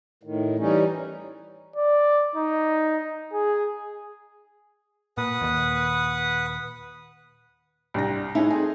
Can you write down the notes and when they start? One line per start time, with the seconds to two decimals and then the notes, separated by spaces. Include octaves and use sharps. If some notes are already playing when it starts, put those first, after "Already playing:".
0.23 A2 D#3
0.59 E3 G3 C#4 D#4
1.76 D5
2.36 D#4
3.33 G#4
5.17 A#2 B4 F#5 D#6
5.41 D#2 A#2
7.94 C2 G2 A#6
8.35 G#3 C#4 D#4 E4
8.50 A3 C4 G#4